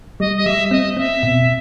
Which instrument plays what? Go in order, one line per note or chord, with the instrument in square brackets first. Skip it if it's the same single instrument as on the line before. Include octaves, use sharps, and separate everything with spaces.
[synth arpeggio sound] G3 [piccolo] D#5
[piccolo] D#5
[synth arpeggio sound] G3 [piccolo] E5
[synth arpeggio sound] C4 [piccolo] D#5
[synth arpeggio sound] C4 [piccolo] E5
[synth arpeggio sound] B2